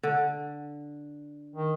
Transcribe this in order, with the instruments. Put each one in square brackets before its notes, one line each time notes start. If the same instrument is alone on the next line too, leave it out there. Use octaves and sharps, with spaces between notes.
[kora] D3
[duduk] D#3